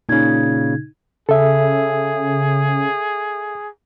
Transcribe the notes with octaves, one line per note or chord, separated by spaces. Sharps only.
A#2 C#3 D#4 G#6
C#3 G#4 A4 E5